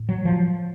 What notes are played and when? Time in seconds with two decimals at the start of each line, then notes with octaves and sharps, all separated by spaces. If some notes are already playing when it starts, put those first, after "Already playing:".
Already playing: A2
0.09 F#3
0.25 F3